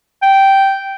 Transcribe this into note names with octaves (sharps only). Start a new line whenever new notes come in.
G5